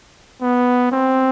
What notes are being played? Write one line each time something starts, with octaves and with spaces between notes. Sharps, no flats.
B3
C4